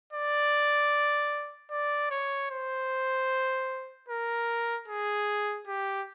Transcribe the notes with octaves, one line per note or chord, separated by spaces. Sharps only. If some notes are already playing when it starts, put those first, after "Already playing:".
D5
D5
C#5
C5
A#4
G#4
G4